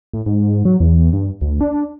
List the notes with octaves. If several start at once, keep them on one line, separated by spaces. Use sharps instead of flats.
A2
G#2
F#3
E2
G2
D2
D4